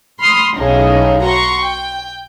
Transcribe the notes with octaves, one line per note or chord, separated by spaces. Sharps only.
B5 C6 D#6 F6
B1 A2 C#3 D#4 G#4
F#4 A#5 C6 C#6
G5